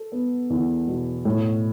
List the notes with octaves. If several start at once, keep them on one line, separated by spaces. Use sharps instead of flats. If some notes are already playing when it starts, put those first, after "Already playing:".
Already playing: A4
B3
E2
B2
A2